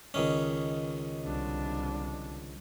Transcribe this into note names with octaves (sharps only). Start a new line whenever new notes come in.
C#2 D#3 C#4
C2 D4